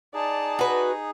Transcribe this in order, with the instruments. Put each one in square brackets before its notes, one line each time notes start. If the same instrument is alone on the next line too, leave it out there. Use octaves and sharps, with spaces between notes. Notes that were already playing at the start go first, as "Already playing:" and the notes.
[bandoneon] D#4 G#4 [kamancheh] D5 A5
[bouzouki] F#4 B4